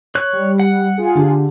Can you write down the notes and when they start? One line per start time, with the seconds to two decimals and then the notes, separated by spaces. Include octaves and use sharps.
0.15 C#5 F#6
0.33 G3
0.60 F#5
0.98 F4 G#4
1.15 D3 G4